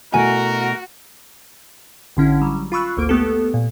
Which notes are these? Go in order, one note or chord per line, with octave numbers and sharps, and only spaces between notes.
B2 A3 E4 F#4 A#4 G#5
A1 D3 C#4 E4
F#3 G3
F4 B5 C#6 E6 F#6
G#1 D2 A#3 D7
A3 B3 G4 A4
A#2